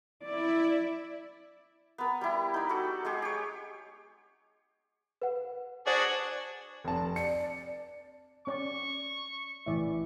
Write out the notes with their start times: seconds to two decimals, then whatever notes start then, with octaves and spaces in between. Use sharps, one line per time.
0.23 E4 D5
1.98 B3 A#4
2.21 G3 E4
2.54 D#4 D5
2.69 F#4 A4
3.05 G#3 G4 G#4
3.22 G4 C#5
5.22 B4 F#5
5.87 D4 F#4 G#4 C5 D5
6.85 F1 A5
7.16 D5 C#7
8.47 C#4 D5 C#6
9.66 A1 E3 D5 E5